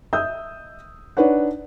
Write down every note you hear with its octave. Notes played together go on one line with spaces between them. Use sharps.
D#5 E5 D#6 E6 G6
D4 D#4 B4 C#5 F#5